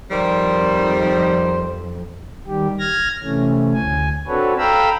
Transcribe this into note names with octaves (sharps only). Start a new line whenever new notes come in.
F2 D#3 G3 C5
D#3 G3 G4
F6 G#6 A#6
C3 E3 A3 C#4
D2 G#5
C4 D4 F#4 A4 B4 C#5
A4 F5 G5 A#5 B5 E6